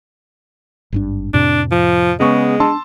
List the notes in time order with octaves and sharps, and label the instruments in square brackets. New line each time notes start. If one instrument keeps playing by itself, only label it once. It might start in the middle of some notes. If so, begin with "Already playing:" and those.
[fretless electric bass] G#1 G2 D4
[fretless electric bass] F2 A2 C3 [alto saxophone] D4
[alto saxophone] F3
[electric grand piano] C#3 B3 C#6 [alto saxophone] G#3
[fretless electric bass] D4 [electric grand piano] A5 C6 E6